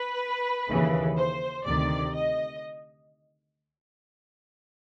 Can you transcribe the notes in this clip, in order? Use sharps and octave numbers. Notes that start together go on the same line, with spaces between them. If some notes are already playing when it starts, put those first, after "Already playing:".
Already playing: B4
D#2 C#3 E3
C5
D2 C3 D#3 D5
D#5